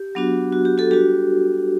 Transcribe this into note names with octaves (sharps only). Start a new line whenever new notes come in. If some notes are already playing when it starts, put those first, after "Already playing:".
Already playing: G4
F#3 B3 D4 F#4
F#4
G4
F#4 A4
G3 D4 F#4 G4